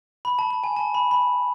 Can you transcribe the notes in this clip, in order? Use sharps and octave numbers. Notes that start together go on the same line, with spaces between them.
B5
A5
A5
G#5
A5
B5
B5